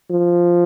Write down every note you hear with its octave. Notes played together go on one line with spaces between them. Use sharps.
F3